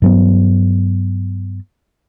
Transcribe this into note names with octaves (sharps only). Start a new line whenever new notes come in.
G2 F#3 B3